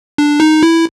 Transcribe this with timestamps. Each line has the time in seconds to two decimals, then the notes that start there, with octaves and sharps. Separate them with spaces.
0.18 D4
0.40 D#4
0.63 E4